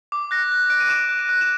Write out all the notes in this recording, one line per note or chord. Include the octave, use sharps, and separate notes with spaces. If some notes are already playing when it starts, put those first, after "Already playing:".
D6
F#6 A#6
F#6
F#6 D7
D#7
D6 E7
F#6
D#7
F#6
E7